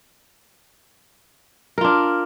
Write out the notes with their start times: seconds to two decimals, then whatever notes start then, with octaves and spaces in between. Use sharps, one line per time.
1.78 A#4
1.81 F4
1.84 D4